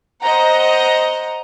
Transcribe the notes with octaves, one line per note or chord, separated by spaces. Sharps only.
C5 D#5 F#5 A#5